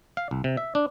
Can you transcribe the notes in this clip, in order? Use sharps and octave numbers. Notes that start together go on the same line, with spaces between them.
F5
C2
C3
E5
D4